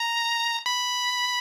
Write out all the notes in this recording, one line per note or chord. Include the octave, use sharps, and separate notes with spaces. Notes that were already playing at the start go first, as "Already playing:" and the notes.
Already playing: A#5
B5